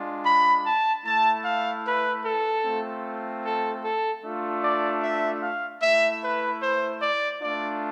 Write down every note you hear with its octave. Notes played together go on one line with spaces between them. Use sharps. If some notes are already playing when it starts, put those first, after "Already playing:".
Already playing: G#3 D4 F4
B5
A5
A3 E4 A5
F5
B4
A4
A3 C4 F4
A4
A4
A3 D4 F4
D5
E5
F5
A3 E4 E5
B4
C5
D5
A3 D4 F4 D5